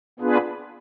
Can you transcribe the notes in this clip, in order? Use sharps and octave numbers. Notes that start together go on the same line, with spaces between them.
B3 D4 F4 G#4 B4